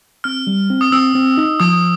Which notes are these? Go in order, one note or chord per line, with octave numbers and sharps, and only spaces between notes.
C4 F6
G3
C4
D#6
C4 E6
C4
D#4
F3 D#6